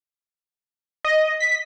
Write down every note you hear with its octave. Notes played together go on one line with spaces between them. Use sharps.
D#5
B6